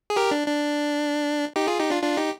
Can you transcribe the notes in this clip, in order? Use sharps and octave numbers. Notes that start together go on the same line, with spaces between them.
G#4
G4 A#4
D4
D4
D#4 G4
F4 G#4
D#4 G4
D4 F4
D4 F4
D#4 G4